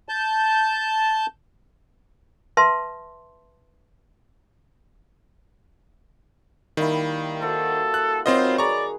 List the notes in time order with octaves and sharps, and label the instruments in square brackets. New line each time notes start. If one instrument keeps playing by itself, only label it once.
[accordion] A5 G6
[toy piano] B4 E5 A5 C6
[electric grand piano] D#3 [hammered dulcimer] G3 A#3 E4
[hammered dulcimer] F#4 G4 C5 [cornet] A4
[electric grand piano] F#6
[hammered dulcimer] D#3 F#3 B4 [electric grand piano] C4 C5 D#5 [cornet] F4
[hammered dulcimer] G#4 B4 [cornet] D5 [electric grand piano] A#5 C#6